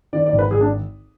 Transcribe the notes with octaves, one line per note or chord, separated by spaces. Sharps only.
D#3 D5
D5
G#1
B4
G#1 G#4
D4